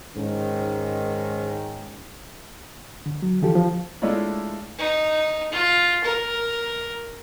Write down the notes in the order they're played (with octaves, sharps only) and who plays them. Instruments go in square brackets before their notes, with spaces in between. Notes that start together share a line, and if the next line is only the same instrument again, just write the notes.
[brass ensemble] G#2 D#3 C#4
[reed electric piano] D3
F#3
D3 E3 F3 F4 G4 A4
F3
[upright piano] G#3 A3 D4 E4 F4 C#5
[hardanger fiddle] D#4
F4
A#4